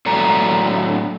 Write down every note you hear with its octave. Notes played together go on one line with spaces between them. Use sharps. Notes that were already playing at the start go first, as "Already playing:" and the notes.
A2 F#3 A4 D5 A#5